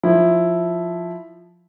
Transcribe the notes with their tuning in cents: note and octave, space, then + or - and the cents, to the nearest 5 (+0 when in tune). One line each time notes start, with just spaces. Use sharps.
F3 +5 E4 +0